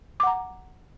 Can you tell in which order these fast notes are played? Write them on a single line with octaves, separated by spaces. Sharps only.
D6 F#5 A#5